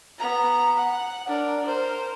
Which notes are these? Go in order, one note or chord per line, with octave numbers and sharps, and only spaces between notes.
B3 A#5
F#5
D4 A#4
A#4 C5